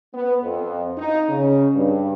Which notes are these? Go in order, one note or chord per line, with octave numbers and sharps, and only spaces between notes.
B3
F2
D#4
C#3
G2